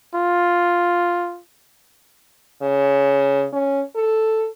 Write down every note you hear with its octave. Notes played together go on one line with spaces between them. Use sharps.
F4
C#3
C#4
A4